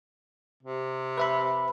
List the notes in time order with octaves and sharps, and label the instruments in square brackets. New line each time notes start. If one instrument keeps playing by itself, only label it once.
[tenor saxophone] C3
[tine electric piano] B4 E5 B5